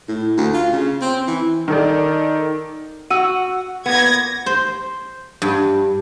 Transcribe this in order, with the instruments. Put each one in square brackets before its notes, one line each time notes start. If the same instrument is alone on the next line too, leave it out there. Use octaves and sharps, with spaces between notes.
[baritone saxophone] A2
D2
F4
C#3
C4
E3
[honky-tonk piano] D#3 A4 D5
[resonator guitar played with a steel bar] F#4 [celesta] E6 D#7
[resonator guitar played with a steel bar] A#2 B3 [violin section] G#6 A#6
[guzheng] C5
G2